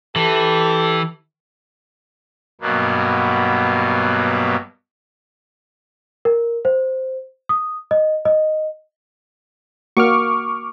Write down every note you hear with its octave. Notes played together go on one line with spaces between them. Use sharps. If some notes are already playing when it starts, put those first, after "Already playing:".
E3 G4 A4
G2 B2 F#3 A#3 B3
A#4
C5
D#6
D#5
D#5
A#3 F#4 C#6 D6 F6